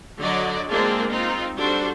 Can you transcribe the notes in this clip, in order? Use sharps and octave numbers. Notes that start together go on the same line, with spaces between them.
D3 F#3 F#4 D5 D#5
G#3 A#3 C4 D4 F4 G#4
C4 D#4 F4
G3 D4 F#4 A4 C5